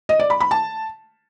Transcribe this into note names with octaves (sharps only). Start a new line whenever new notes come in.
D#5
D5
B5
B5
A5